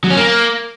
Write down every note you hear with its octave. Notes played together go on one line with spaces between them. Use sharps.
F#3
C#4
A#3